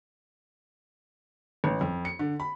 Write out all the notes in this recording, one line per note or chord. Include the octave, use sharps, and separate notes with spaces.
A1
F2
C#7
D3
B5